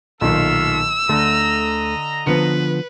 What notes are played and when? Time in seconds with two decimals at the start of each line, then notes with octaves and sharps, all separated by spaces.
0.21 B1 A#2 D#3 A4 E5 F5 E6
1.09 D2 D3 A3 D#5 A#5
2.27 D3 F3 B3 B4 C#7